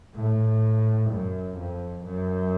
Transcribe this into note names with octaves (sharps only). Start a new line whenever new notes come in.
A2
F#2
F2
F#2